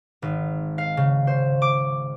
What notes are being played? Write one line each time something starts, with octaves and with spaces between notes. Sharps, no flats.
G#1
F5
C#3
C5
D6